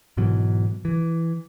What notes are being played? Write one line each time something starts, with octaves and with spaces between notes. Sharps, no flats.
G#2 B2 E3 F#3
E3